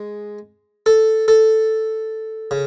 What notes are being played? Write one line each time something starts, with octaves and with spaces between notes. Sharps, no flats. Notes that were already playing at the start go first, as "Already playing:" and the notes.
Already playing: G#3
A4
A4
C#3